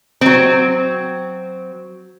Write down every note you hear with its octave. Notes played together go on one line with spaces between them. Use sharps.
F#3 C4